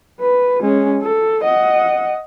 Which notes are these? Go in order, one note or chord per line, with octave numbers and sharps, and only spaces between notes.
B4
G#3 C#4
A4
D#5 F#5